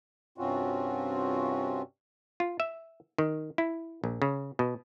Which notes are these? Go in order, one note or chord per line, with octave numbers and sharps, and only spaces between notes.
G2 C3 C4 C#4 F4 F#4
F4
E5
D#3
E4
A#1
C#3
B2